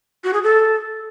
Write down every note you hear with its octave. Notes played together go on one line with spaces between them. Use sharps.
F#4
G#4
A4